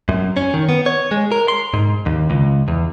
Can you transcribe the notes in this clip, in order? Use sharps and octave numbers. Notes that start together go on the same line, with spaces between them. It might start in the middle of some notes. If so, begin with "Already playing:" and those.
F#2
C#4
D#3
B3
C#5
G#3
A#4
C6
G#2
D#2
C#2
E2